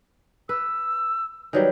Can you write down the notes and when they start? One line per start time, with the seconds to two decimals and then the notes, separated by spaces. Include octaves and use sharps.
0.49 B4 E6
1.53 D#3 F#3 G3 B4